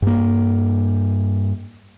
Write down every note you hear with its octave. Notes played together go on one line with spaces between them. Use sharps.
G2 A#3